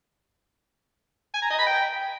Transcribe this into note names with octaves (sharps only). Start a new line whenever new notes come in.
G#5
A#5
D#5
B5
G5